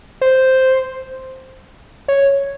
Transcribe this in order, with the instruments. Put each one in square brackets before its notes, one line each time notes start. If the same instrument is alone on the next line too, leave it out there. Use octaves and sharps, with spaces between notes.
[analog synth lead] C5
C#5